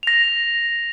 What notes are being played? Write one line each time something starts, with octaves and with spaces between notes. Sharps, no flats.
A#6 F7